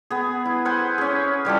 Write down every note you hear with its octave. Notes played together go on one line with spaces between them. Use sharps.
B3 G#4
E4
B4 C5 F#5 G#5
C#4 G#4
E3 G3 F4 A4